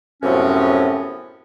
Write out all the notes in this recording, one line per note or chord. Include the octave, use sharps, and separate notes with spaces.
F#2 A2 C3 F3 B3 C#4